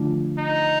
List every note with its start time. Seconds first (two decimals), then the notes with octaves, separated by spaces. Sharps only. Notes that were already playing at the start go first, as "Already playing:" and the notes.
Already playing: D3 F3 A3 D4 F4
0.38 D#4